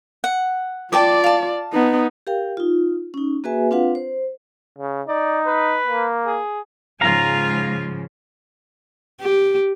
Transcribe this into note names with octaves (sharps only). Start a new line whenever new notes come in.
F#5
F4 D5 G5 A5 D6
F5 A5
B3 D#4
G4 A#4 F5 G5
D#4 F4
C#4 D#4
A#3 F#4 G#4 B4 E5 G#5
C4 D4 F4 B4 F5 F#5
C5
C#3
D#4 D5
B4
A#3
G#4
G#2 C#3 F3 F4 F5 G#5 A#5
G4